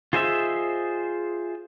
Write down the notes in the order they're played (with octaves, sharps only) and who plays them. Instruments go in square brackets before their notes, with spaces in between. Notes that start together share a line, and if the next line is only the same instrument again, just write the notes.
[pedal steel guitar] F4 G#4 C5 D#5 E5